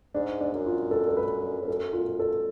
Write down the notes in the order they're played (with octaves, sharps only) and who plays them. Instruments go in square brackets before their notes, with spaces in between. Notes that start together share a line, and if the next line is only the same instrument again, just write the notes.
[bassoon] G#2 [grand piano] D4
[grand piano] D4
[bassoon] F#2
[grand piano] F4
A4
A4
B4
[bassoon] F2
[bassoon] F#2 [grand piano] A4
[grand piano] F4
A4